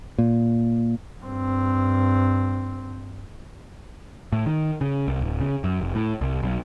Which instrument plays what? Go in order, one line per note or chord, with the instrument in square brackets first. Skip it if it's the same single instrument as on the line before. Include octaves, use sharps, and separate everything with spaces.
[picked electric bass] A#2
[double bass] G2 C4
[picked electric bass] A2
D#3
C#3
C2
D1
C#3
F#2
F1
A2
C2
B1